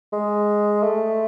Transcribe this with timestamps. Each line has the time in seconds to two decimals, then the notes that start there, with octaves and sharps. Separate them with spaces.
0.13 G#3
0.83 A3